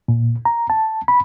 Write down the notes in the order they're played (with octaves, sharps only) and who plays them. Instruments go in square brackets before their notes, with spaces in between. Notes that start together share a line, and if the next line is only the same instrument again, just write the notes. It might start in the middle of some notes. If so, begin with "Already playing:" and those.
[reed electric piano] A#2
A#5
A5
B5